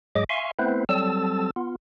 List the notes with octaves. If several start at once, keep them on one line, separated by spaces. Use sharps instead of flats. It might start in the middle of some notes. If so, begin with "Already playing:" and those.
G#2 F#3 G#3 G#4 D#5 D6
E5 F5 G#5 C6 C#6
A3 B3 C4 E4 B4 C5
F#3 G3 C4 A4 A5 E6
B3 F4